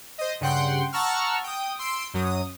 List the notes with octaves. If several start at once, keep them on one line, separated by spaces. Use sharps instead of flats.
C5 D#5
G2 C#3 F#5 G5 C6
F#5 A5 A#5 C#6 E6 F6
G5 D#6
C6 E6 C7 D7
F#2 F#3 D#6